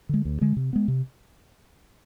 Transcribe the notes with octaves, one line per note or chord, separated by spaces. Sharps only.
D3 G#3
D2
D3 G#3
C3
G#3 B3
C3